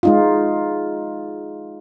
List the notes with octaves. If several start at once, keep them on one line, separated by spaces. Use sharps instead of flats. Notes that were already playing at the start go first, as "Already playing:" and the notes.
G#3 D#4 F4